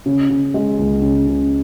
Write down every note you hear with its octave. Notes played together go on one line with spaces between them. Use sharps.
C#3
C#3
G#3
C#2
C#3
C#3